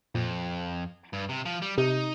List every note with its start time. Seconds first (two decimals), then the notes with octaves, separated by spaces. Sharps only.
0.15 F2 A#2
1.13 G2
1.29 C3
1.45 F3
1.62 G3
1.78 C3 D#4